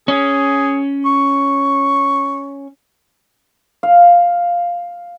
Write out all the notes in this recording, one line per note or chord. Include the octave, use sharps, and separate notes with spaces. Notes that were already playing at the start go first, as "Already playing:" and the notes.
C#4 G#4
C#6
F5